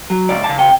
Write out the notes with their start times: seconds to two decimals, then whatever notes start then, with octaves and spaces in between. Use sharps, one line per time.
0.10 F#3
0.29 C#2 D5
0.44 C#3 A5
0.59 G5